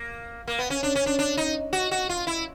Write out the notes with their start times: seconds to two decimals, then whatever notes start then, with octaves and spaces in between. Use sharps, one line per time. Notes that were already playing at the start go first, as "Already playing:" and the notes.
Already playing: A#3
0.47 A#3
0.59 B3
0.70 C#4
0.83 D4
0.95 C#4
1.06 D4
1.19 D4
1.37 D#4
1.73 F#4
1.91 F#4
2.09 F4
2.27 E4